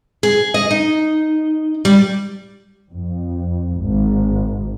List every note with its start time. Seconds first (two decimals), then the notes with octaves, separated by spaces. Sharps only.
0.23 G#4
0.54 D#5
0.71 D#4
1.85 G3
2.91 F2
3.80 G#1